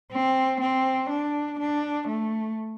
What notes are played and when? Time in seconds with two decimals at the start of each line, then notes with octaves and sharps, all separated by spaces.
0.12 C4
0.61 C4
1.10 D4
1.59 D4
2.08 A3